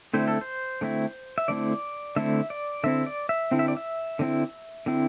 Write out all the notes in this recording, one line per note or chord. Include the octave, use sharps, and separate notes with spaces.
D3 A3 C4 E4 C5
A4
C5
D3 A3 C4 E4
E5
D3 A3 C4 E4 D5
D3 A3 C4 E4 E5
D5
D3 C4 E4 E5
D5
E5
D3 C4 E4
E5
D5
E5
D3 C4 E4
D3 C4 E4